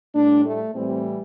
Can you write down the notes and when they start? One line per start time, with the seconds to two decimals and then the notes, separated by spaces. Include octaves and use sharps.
0.15 A2 G3 D4
0.45 A3
0.74 A2 E3 G3 C4